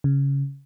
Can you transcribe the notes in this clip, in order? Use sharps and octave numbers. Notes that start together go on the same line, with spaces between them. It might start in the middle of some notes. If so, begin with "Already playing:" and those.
C#3